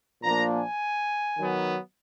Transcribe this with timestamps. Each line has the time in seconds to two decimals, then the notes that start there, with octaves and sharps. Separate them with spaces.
0.23 A#2 F3 A#3 D4 A#5
0.51 G#5
1.38 D#3 F#3 B3